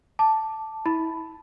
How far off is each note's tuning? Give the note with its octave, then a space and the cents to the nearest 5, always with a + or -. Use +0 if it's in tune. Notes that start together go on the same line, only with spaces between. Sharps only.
A5 +0 D6 +0
E4 -25 B5 +5